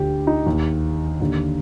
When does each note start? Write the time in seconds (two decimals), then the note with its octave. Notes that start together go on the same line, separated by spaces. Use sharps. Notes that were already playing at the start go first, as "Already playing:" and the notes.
Already playing: D2 D3 G4
0.27 D#4
0.46 D#2 D#3
1.20 D#2 D3